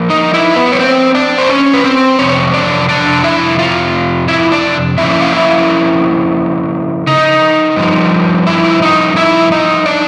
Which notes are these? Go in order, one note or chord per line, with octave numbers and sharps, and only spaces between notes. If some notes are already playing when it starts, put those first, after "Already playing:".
Already playing: F3 A#3
D#4 D#5
E4 E5
B3 B4
C#5
C4 C5
D4 D5
C5
C#4 C#5
B4
C4 C5
F2 C3 C#5
D4 D5
D4 D5
E4 E5
F4 F5
E4 E5
D4 D5
C#3 F3 A#3 C#4 E4 E5
F5
E4 E5
D#4 D#5
G2 D3 F3
E4 E5
D#4 D#5
E4 E5
D#4 D#5
D4 D5